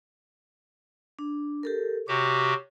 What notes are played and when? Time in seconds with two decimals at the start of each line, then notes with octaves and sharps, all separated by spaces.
1.19 D4
1.63 G4 A4 A#4
2.08 C3 F#4 G4 C#5